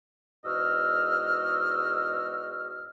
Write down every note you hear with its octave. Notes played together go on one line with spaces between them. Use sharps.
E2 G#2 F#4 D#5 E6 F6